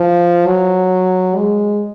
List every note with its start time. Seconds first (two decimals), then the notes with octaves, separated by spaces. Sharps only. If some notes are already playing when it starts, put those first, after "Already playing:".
Already playing: F3
0.47 F#3
1.36 G#3